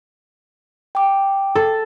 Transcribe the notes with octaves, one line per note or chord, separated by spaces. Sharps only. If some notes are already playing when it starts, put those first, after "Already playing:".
G5 D6
A4